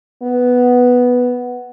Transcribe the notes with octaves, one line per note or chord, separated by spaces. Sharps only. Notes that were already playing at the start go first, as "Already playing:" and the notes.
B3